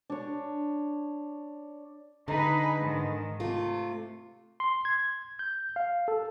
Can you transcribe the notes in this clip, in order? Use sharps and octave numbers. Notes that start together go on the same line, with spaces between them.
D4 C#5
D3 D#4 G#4 B4
G#2 D#3
C3 A3 F4
C6
G#6
G6
F5
A4